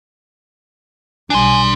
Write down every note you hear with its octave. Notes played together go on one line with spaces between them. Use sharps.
B1 G3 D4 G#5 C6